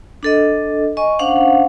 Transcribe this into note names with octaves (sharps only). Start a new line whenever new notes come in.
D4 A4 D#5
D#5 G#5 C#6
C#4 D4 C5 F5 F#5